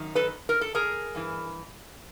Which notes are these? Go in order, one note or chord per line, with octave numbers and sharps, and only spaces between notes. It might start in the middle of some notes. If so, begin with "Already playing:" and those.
Already playing: F#2 D#3
A4 B4
A#4
A4
G#4 A#4
G2 E3